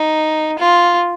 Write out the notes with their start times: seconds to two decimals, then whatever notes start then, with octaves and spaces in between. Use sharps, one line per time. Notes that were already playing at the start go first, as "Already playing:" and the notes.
Already playing: D#4
0.59 F4